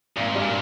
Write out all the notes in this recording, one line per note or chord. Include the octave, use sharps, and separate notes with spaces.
G#1 A#2
G#2
G2 G3
A#2